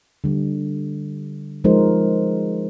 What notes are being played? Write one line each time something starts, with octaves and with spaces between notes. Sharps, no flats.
D3 G3
F3 G#3 D#4 A#4 C5